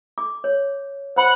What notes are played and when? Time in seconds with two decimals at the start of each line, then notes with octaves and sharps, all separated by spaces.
0.18 D6
0.44 C#5
1.16 C5 F#5 B5 C6